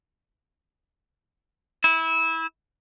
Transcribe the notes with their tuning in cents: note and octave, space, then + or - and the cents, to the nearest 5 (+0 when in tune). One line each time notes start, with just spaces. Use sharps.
E4 -20